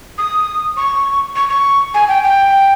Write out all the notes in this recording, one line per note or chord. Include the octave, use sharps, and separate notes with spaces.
D#6
C#6
C#6
C#6
G#5
G5
G5